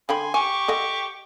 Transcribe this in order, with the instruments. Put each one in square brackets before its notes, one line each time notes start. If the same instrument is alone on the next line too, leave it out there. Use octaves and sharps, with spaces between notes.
[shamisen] D3 G5 B5 [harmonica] G#5 C6
[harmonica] G4 C#6 D6 [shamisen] G#5
[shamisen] A4 D#5 F#5